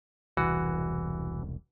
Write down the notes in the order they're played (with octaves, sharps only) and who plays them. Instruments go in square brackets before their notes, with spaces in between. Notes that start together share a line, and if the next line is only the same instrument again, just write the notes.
[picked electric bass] E1 C2 [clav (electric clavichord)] E3 F#4